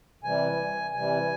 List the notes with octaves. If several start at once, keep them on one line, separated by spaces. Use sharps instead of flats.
C3 E3 G3 G#5
C3 E3 G3 G#5